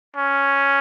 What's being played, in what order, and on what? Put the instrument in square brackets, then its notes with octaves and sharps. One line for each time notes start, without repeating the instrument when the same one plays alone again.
[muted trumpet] C#4